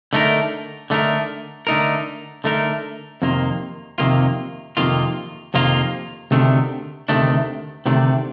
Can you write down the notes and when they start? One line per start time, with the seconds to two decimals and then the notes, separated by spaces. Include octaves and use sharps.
0.13 D3 A3 D#4 A#4
0.90 D3 A3 D#4 A#4
1.67 D3 A3 D#4 A#4
2.44 D3 A3 D#4 A#4
3.22 F2 C3 D#3 A#3 F4
3.98 F2 C3 D#3 A#3 F4
4.77 F2 C3 D#3 A#3 F4
5.54 F2 C3 D#3 A#3 F4
6.31 D2 C3 D#3 A3 D4
7.08 D2 C3 D#3 A3 D4
7.86 D2 C3 D#3 A3 D4